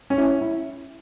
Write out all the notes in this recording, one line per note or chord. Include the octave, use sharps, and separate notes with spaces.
C#4
E4
E4